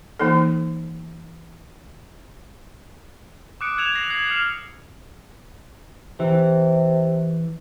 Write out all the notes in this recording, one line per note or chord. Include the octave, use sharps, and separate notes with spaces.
E3 A#3 D#4 A4
D6 D#6 F#6 C#7 D7
E6 G#6 E7 F7
A#6 C7 E7 F#7
F#6 G#6 C7 F#7
D#6 F6 C7 C#7 E7 F7
C3 E3